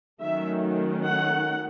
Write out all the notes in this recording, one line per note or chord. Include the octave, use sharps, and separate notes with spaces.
D#3 F#3 A3 C#4 E5
F#5